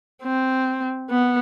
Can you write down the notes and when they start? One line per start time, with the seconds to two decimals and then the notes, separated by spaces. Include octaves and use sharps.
0.23 C4
1.10 B3